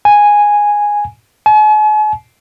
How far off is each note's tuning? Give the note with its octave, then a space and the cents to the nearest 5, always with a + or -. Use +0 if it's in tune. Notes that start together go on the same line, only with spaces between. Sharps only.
G#5 -5
G#5 +45